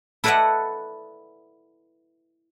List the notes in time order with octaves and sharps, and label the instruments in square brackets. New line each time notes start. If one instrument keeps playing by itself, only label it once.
[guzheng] E4 A4 B4 D5 D#5 F#5